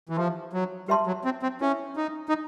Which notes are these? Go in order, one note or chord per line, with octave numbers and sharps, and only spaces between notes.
E3
F3 G4 B4 E5 A5 C6
F#3
G3 G4 B4 E5 A5 C6
F#3
C4
C4
C#4 E4 G#4 B4 E5
D#4
D#4